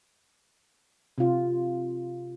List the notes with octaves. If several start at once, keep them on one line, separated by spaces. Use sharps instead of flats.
C3 F4